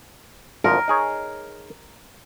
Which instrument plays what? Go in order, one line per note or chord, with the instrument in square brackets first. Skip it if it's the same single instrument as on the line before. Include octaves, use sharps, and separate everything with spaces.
[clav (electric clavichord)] G#1 D2 F3 [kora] A#4
[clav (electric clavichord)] D#4 G#4 C#5